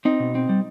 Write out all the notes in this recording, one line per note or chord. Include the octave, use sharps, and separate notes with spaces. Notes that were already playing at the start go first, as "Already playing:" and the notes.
C4 D#4
B2
C4
G3